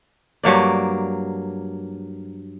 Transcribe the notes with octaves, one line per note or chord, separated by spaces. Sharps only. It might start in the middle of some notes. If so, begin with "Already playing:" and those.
G2 F#3 A#3 D5